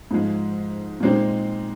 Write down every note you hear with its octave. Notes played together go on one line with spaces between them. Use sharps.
G#2 F3 G#3
A#2 G#3 C4 D#4